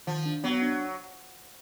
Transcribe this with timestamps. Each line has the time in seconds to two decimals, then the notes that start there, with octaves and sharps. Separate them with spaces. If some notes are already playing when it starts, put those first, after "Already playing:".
0.07 D#3 F3
0.26 D4
0.44 F#3 B3
0.62 D4